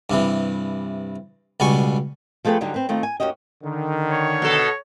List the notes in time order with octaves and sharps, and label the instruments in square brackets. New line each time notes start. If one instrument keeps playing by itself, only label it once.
[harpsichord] G2 C3 E3
C#2 B2 G3 G#5 C#6
[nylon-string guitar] F3 A3 G#4 A4 B4 G5
D3 F#3 G3 D#4 G4
C4 B4
D#3 A3 C4 F4
G#5
D#2 A#2 C#4 F#4 G4 D#5
[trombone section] D3 D#3
[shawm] C#5
[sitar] B2 A4